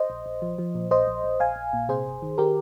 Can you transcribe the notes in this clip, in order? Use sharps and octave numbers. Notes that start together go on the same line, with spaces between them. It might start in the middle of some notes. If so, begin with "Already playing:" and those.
Already playing: C5 D#5
A#1
A#1
F3
F3
A#2
A#1 C5 D#5
A#1
A#1
A#1 F5 G#5
A#1
A#2
C3 G#4 C5
G1
D#3
D#3 G4 A#4